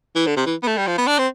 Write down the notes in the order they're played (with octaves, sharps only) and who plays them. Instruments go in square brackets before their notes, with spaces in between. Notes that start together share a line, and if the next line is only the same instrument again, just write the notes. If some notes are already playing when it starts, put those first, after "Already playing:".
[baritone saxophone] E3
D3
C3
E3
B3
A3
G3
F3
B3
D4
C4